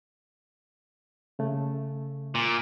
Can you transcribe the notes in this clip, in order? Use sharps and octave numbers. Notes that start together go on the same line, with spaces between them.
C#3 A3
A#2